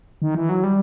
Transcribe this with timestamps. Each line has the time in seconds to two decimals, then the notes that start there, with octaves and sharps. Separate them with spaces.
0.22 D#3
0.35 E3
0.49 F#3
0.64 G3